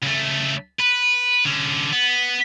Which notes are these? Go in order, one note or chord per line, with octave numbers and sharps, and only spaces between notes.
C#2 A3
B4
D3 C#4
B3